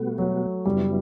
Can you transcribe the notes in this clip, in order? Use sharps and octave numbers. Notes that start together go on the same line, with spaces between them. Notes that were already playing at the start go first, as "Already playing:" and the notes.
Already playing: B2 G3 A3 B3 F#4
F#3
F#2 C#3 F#3 G3 B3 E4